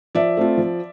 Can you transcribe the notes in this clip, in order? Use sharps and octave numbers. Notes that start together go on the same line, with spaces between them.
F3 D5 E5
A3 C4 F4
F3